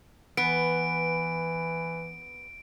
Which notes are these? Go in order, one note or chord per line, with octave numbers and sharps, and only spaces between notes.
E3 B3 D7